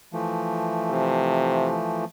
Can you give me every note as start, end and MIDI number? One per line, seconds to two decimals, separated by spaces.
0.13 2.05 52
0.13 2.05 53
0.13 2.05 57
0.90 1.73 48